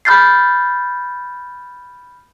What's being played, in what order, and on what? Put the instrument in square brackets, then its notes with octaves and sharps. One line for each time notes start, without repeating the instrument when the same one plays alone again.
[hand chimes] B5 F6 G6 A6 C7